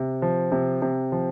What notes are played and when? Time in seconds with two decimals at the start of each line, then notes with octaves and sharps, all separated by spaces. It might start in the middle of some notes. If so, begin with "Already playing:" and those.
Already playing: C3
0.22 F3
0.52 C3
0.82 C3
1.12 F3